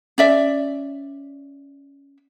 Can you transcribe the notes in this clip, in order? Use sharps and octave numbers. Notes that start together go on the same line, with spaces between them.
C#4 D5 E5